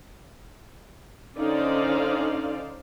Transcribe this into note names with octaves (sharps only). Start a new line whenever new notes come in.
D3 C#4 D#4 C5 D5 F5